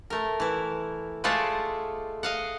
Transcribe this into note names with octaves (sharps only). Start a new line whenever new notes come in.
A3 A#4
E3 E4
G#3 A3 F4 D5 E5 F#5
D#5 F5 F#5